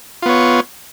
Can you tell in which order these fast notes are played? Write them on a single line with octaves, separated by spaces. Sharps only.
F4 B3 C#5